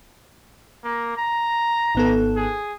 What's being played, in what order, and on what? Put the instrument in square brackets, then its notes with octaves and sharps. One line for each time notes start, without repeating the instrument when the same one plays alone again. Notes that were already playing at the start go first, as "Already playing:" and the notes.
[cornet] A#3
A#5
[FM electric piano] G#1 B3 A4
[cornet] G#4